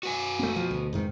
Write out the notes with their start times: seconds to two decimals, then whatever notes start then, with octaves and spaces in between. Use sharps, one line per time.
0.03 F#4 B4 G#5
0.39 A3 C4
0.56 F3
0.71 D2
0.93 F1 G#2 D#3